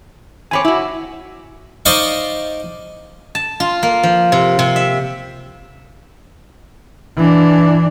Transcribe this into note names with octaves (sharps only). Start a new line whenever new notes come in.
E2 C4 C#5 G#5 B5 D6
E4 F#4
D#4 C5 D5 D#5 F5 C#6
A5
F4
A#3
F3
C3
C3
E5
E3 D4